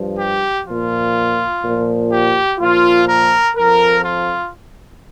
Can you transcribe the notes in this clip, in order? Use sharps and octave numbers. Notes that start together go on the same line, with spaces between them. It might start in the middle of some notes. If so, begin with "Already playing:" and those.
Already playing: G2 F3
G4
A#2 F3 F4
A#2 F3
G4
A#2 F3 F4
A#4
F2 F3 A#4
F4